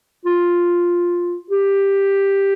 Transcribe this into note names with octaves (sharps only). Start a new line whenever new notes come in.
F4
G4